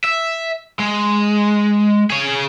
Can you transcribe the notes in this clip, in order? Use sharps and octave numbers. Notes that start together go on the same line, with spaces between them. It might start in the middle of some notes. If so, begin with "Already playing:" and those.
E5
G#3
G#4 C#5